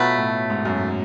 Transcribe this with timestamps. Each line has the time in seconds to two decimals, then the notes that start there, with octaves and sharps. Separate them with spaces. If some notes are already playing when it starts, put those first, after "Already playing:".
Already playing: B2 F#3 A3 F4 B4
0.18 A2
0.50 G#2
0.65 F#2